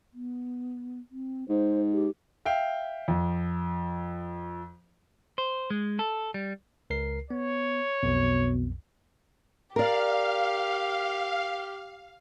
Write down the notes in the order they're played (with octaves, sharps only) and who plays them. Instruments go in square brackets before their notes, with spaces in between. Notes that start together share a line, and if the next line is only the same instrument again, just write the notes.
[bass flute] B3
C4
[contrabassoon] G#2 [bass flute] C5
[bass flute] G4
[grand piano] E5 F5 G5
F2
[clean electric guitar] C5
G#3
A4
G3
[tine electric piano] C#2 A#4 C7
[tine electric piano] B3 [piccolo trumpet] C#5
[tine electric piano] B1 F2 [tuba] B2
[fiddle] G4 [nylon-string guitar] A#4 D5 [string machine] F5